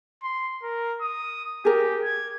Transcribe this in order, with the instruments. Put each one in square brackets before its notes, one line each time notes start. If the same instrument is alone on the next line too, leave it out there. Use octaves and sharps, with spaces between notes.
[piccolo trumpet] C6
A#4
D#6
[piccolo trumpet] G4 [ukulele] G#4 A#4
[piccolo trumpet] G#6